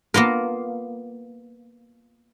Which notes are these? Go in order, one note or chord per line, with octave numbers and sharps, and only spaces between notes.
A#3 B3 F4 A#4